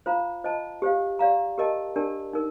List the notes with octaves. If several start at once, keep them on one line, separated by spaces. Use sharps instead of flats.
F4 C5 F5 A#5
F4 C5 D#5 A5
G4 C5 F5
G4 D5 F5 A#5
G4 A#4 D#5 A5
D4 G4 A#4 D5 A5
D#4 A#4